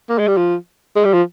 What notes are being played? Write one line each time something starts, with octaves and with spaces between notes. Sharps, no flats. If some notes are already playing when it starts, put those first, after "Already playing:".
A#3
G#3
G3
F3
G#3
G3
F3